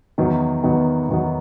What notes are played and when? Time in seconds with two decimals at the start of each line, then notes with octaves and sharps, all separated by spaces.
0.18 E2 D#3 F#3 B3
0.63 E2 D#3 F#3 B3
1.09 E2 D#3 F#3 B3